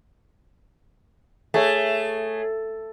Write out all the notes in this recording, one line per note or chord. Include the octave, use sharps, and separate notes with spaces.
A3 G#4 C#5